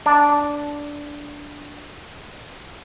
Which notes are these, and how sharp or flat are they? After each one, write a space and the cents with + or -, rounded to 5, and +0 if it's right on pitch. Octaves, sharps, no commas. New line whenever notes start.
D4 -10